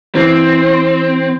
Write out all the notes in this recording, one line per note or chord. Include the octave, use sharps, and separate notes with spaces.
E3 C4